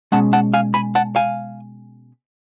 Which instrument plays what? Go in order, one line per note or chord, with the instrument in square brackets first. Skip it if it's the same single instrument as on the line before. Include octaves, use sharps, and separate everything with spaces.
[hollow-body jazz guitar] B2 G#3 C#4 F#5 A5
F#5 A5
F5 G#5
G#5 B5
F#5 A5
F5 G#5